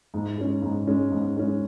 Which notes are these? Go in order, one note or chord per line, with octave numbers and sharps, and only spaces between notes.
G#2
G#3 C#4
G#2
G#3 C#4
G#2
G#3 C#4